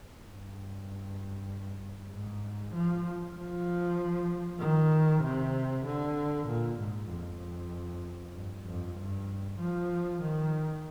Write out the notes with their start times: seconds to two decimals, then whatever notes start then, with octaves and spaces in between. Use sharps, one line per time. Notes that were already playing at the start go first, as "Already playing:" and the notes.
0.23 G2
2.11 G#2
2.74 F3
3.35 F3
4.60 D#3
5.23 C3
5.86 D3
6.47 A#2
6.78 G#2
7.10 F2
8.34 G2
8.66 F2
8.98 G2
9.59 F3
10.22 D#3